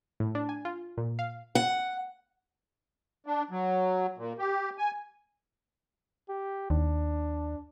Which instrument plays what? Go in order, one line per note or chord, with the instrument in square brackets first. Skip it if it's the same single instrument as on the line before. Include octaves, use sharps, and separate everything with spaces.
[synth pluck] A2
D4
G#5
F4
A#2
F5
[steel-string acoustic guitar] F#5
[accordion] D4
F#3
A#2
G4
G#5
[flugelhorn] G4
[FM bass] D#2 [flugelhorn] D4